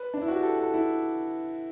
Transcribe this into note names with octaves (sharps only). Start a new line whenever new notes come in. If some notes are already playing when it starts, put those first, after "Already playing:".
Already playing: B4
D4
E4
F#4
G4
A4
A4
E4